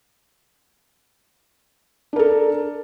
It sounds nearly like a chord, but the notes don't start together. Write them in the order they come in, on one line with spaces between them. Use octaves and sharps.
D4 A#4 A4